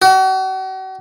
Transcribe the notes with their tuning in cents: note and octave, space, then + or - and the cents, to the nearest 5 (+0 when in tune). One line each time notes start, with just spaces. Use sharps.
F#4 +40